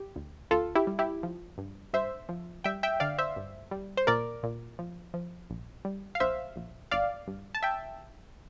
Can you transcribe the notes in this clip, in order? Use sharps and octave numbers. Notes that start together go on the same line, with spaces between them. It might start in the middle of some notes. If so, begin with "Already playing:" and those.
Already playing: G4
D2
D2 F4 A4
E4 G4
G3
E4 G4
F3
G2
G2 C5 E5
F3
G3 E5 G5
E5 G5
D3 D5 F5
C5 E5
G2
G3
C5
A#2 A#4 D5
A#2
F3
F3
A#1
G3
F5
A#1 C5 E5
A#1
G1 D5 F5
G2
A5
E5 G5